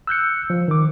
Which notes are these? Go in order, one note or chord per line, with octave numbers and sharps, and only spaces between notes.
E6 F#6 G6 C#7
F3
D#3 D6